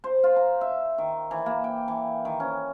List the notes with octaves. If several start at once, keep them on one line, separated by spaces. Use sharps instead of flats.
C5
F4
A#5
E5
D#3
E3
A#3
G5
E3
D#3
C#4